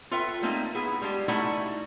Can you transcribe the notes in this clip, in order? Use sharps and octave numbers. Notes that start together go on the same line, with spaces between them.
F4 A4 B4 E5 G5
G3 A3 A#3 C4 D#4
B3 E4 G#4
G3 G#3 D4 G4
A3 D#4 E4 F#4 A4 D5